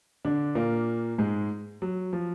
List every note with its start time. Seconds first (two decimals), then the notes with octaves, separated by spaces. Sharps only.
0.25 D3 D4
0.55 A#2 A#3
1.18 G#2 G#3
1.82 F#3
2.13 F3